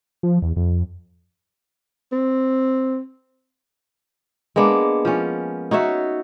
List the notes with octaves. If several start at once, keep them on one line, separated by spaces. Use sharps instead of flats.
F3
E2
F2
C4
G#3 A#3 B3 D4
F3 C#4
D#4 F#4 C#5 E5